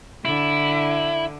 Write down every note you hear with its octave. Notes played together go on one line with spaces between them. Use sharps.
D3 E4